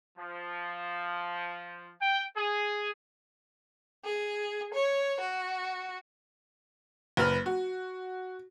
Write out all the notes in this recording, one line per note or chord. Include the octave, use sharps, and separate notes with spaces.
F3
G5
G#4
G#4
C#5
F#4
F#1 B4 F6
F#4